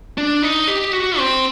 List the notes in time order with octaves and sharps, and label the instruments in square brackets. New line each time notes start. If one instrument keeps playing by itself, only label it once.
[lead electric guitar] D4
D#4
G4
F#4
C4